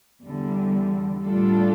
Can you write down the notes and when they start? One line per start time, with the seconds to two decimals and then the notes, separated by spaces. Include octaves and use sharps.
0.24 E2 D3 G3
1.24 A2 G3 D4 F4 A4